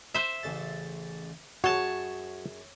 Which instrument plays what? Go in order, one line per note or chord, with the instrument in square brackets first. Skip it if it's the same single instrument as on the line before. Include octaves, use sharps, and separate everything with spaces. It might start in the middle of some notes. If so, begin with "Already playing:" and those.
[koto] C5 E5
[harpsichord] A1 C#3 A5
[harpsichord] F#2 G#4 [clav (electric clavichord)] F#4 [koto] C#5 A5